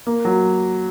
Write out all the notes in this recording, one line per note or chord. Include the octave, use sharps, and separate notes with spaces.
A#3
F#3